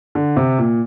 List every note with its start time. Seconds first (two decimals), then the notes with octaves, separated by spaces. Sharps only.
0.15 D3
0.36 C3
0.58 A#2